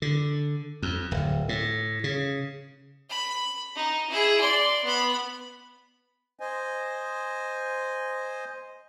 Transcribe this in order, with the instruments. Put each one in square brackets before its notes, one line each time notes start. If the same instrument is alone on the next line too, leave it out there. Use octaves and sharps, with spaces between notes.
[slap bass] D3
F2
D1
A2
C#3
[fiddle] B5
D#4
E4 G#4
D5 C6
B3 B5
[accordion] C5 D#5 G#5